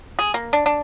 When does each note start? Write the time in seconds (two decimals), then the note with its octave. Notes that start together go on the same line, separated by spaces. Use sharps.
0.19 G#4
0.34 A#3
0.53 D4
0.66 D4